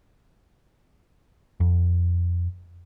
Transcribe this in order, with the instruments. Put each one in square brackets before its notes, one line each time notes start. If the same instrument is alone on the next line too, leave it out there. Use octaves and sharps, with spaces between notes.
[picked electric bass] F2